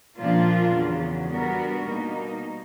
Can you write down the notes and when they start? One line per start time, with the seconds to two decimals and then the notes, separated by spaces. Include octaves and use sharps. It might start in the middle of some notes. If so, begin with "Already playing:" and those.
0.18 A#2 F3 A#3 D4 F4
0.74 E2 C#3 F#3
1.30 G3 B3 D4 F#4 A#4
1.86 B2 G3 A#3 D#4